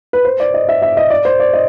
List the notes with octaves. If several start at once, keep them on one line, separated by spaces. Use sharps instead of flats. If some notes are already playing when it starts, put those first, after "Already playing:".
B4
C5
D5
D#5
E5
E5
D#5
D5
C5
D5
D#5